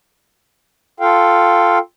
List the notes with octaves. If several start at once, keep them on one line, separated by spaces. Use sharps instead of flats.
F4 A4 F5 G5